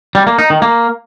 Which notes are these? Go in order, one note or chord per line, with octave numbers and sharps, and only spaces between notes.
G3
A#3
D#4
D#3
A#3